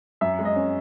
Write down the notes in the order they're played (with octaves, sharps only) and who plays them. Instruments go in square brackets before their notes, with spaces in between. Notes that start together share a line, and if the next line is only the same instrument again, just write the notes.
[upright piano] F#2 E5
G#3
D#5
C#4